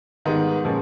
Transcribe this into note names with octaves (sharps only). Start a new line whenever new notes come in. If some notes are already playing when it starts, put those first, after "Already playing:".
G#2 D#3 G3 B3 D#4
A#2 F3 G#3 C#4